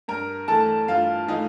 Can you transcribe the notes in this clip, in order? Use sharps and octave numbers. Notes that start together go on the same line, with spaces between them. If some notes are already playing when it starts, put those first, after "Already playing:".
G2 A#4 A#5
E3 A3 A4 A5
G2 F4 F5
E3 A3 D#4 D#5